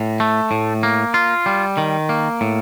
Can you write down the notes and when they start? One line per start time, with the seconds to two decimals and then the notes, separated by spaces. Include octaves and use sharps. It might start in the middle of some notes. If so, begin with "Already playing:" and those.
Already playing: A2
0.20 A3
0.51 A2
0.83 A#3
1.14 F4
1.46 G3
1.78 D#3
2.09 A#3
2.41 A2